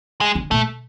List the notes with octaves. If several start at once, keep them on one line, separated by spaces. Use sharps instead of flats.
G#3
D3
A#2 A3